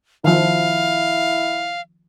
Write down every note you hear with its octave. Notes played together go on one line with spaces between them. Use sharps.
D#3 F3 E4 F5